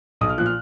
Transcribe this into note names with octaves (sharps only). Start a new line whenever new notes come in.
B1 D#6
F6
A#2 F3 F#6
F6